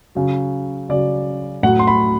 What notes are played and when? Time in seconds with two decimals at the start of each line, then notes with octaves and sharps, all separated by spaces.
0.15 C#3 F#3
0.89 C#3 F#3 D5
1.63 A2 F#3 F#5
1.79 C6
1.87 B5